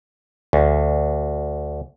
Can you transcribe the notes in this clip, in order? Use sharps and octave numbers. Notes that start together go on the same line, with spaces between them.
D2